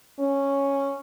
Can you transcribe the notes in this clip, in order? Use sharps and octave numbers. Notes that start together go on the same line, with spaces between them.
C#4